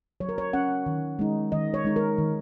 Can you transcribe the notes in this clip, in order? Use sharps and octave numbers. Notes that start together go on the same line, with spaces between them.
F#3 C#5
A#4
C#5
C#4 F#5
D#3
G#3 D#4
D#3 D#5
C#5
G#3 D#4
A#4
D#3